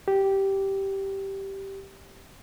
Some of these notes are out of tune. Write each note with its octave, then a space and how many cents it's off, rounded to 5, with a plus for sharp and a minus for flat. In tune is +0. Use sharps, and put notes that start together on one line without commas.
G4 -10